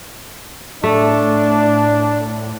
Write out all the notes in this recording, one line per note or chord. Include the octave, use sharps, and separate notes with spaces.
A2 A3 D4